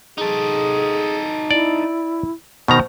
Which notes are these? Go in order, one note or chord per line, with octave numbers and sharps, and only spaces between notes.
D#4 G#4 A4
E4 D5
B2 D#3 C5 A#5